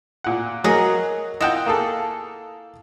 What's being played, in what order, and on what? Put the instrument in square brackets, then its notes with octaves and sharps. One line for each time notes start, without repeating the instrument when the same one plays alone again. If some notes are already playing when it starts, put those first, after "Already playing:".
[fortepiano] A#2 F#5
[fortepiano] F#3 G#4 [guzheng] A#4 D#5 F#5
[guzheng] E4 F4 [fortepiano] D#5 F#5 G5
[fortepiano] A#3 G#4 A4